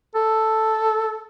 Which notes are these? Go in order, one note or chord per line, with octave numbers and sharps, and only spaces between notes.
A4